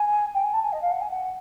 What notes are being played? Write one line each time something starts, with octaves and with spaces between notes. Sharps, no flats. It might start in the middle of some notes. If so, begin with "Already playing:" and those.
Already playing: G#5
G5
G#5
A5
G#5
D#5
F5
F#5
G#5
F#5